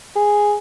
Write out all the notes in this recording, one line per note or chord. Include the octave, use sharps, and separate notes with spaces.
G#4